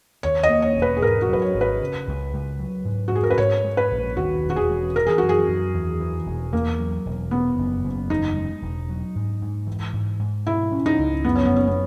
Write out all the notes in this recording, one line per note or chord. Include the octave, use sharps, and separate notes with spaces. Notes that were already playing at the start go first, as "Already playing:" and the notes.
D#2 C#5
D#5
A#3
C#5
E1
B4
G#4
G#2 A#4
F#4
F#3
B4
C#5
G#1
B4
C#3
C#2
C#2
F#3
G#2
F#4
G#2 G#4
A#4
B4
G#2 C#5
G#3
B4
A#1
D#2 F#4
E1
F#4
G#4
E1
E3 A#4
G#4
F#2 F#4
G#4
F#2
E2
E3
E1
E2 A#3
F#3
E1
E2 B3
F#1
F#1
E2 D#4
G#3
E1
F#3
G#2
G#2
E3
G#2
G#2
B2 E4
C#4
D#4
C#2
F#2 B3
C#4
B3
F#1
C#4
B3